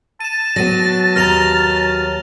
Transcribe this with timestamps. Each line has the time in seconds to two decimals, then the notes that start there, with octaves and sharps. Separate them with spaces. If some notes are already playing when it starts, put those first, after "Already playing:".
0.20 A5 D#7 E7
0.56 F#3 B3 A#6 D#7
1.16 D#2 A#5 F6 A#6 F7